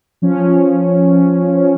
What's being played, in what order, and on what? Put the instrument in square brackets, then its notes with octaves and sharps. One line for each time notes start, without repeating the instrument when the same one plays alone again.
[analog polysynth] F3 C#4